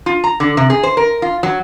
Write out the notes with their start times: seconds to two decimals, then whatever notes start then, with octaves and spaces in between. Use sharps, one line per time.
0.06 F4
0.24 A#5
0.40 D3
0.57 C3
0.70 G#4
0.83 C5
0.97 A#4
1.22 F4
1.43 F#3